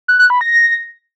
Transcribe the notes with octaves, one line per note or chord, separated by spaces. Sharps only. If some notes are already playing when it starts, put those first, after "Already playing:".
F#6
F#6
B5
A#6